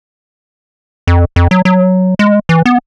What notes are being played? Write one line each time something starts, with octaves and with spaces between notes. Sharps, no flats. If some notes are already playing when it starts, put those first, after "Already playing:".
F2
F2
F#3
F#3
G#3
E3
B3